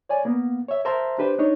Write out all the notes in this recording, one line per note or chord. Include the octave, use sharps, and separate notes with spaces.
C#5 D5 G#5
A#3 B3
C#5 E5
A#4 C5 E5 A5 A#5 C6
D4 G4 B4 C5
D4 D#4 C#5